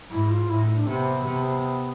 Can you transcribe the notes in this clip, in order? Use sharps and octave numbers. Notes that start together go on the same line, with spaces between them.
G#2 E4
F4
A2 E4
D#4
D4
C3 B3
C3